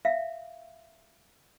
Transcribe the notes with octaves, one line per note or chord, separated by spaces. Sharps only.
E5 F5